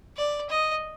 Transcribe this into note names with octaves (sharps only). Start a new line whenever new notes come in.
D5
D#5